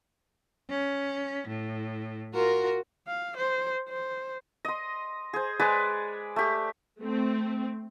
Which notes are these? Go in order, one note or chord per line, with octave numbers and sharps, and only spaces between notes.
C#4
A2
F4 F#4 A#4
F5
C5
C5
D#5 C6
G#4 C5
G#3 G#4 B4 D5
A3 G4
A3 C4